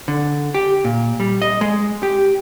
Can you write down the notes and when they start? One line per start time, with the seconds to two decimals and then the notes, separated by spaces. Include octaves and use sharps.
0.08 D3
0.54 G4
0.84 A#2
1.20 G3
1.42 D#5
1.61 G#3
2.03 G4